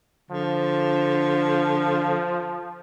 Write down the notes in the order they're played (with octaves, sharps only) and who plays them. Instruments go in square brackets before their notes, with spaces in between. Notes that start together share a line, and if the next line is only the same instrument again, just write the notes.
[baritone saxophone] D3 [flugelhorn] F3